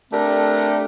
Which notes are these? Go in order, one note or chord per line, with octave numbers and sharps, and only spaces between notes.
A3 C4 D4 G4 A4 A#4